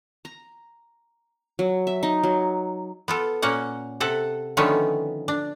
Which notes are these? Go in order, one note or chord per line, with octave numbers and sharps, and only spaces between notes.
A#5
F#3
E5
D#4
F#3
B3 F4 A4
A#2 A#3 C#4 F#5
C3 A4 F#5
D3 D#3 F3 A3 B3 C#4
D4